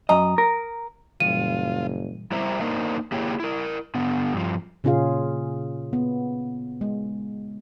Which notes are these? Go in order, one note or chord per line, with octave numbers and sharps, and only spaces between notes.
F#2 D#5 A#5 D#6
A#4
F#1 A#2 E3 G3 F4 D#7
G3 E4 A#4 C5 E5 A#5
A#3 D4 D#4 A#4 C5
A#3 E4 G4 G#4 C#5
E4 A#4
D3 B3
G2 F3
A#2 C#3 C#4 F4 G#4 F5
B3
G#3